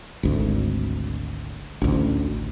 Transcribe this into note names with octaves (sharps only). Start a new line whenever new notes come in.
G#1 D2
A1 D2